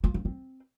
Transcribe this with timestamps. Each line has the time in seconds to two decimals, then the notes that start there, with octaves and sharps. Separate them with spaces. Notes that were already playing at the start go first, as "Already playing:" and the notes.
0.04 F4
0.14 C4
0.25 C4